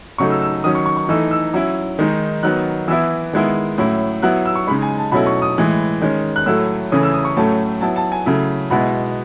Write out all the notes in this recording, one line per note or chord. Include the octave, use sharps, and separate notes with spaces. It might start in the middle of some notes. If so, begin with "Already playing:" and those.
C#3 F#3 A3 D#4 C#6
E6
E6
D#3 F#3 C#4 D#6
C#6
C#6
C#6
E3 A3 D#4 E6
E6
F#3 C#4 E4 E6
D#3 G#3 D#4
D#3 F#3 B3 F#6
E3 B3 E4 E6
D#3 G#3 B3 E4
A2 F#3 C#4 E4
F#3 B3 E4 F#6
E6
C#6
C#3 G#3 D#4 B5
G#5
A5
B2 F#3 A3 C#4 E4 B5
C#6
D#6
A2 E3 G#3
D#3 G#3 C#4
F#6
A2 F#3 A3 E4 E6
C#3 E3 A3 C#4 D#6
E6
D#6
C#6
A2 F#3 A3 C#4 A5
F#3 B3 E4 A5
A5
G#5
C#3 F#3 A3 E4
B2 G#3 B3 E4 B5